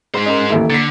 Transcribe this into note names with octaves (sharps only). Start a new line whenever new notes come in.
G#2 G#3 C5
C#4 A#4 D#5
A1 D#2 A#3 E4 A4
D3 A6 B6